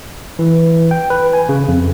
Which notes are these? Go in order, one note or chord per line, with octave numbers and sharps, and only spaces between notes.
E3
G5
B4
G#5
C#3
F2